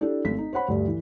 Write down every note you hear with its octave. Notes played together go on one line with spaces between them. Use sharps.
D4 E4 G4 A4
G#1 A3 A4 B6
D#4
C5 C#5 F#5 B5
D2 G2 G3
E3